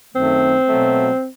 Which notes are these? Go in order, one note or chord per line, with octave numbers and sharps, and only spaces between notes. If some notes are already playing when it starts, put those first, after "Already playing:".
F#2 D#3 A3 C4
B2 F#3 A3